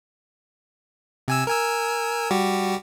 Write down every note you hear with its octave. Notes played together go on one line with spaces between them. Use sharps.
C3 G#5 E6
A#4 G#5 E6
G3 F#4 G4